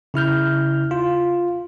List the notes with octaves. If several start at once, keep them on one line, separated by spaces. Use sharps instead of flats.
C#3 E4 F6 G6
F4